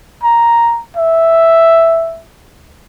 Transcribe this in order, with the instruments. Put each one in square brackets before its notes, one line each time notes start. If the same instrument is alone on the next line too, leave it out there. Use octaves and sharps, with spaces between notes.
[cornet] A#5
E5